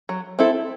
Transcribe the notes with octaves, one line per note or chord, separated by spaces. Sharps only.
F#3
C4 E4 A4